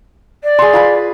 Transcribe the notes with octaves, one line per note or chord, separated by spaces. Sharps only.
D5
G#4 C6
F4 B4 B5